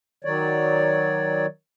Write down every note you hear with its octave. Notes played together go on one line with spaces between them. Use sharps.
D#3 F#3 C#5 D5